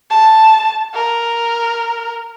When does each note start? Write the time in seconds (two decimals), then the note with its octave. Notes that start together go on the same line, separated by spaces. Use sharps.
0.10 A5
0.94 A#4